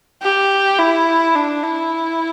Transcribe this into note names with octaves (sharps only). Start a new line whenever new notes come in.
G4
E4
D4
E4